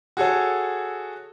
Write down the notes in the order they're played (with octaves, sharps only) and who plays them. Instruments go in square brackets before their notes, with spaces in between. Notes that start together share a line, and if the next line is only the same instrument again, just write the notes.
[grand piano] F#4 G#4 A4 C#5